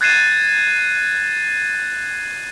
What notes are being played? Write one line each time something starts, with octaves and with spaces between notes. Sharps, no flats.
F#6 G#6 A6 C7 D#7 E7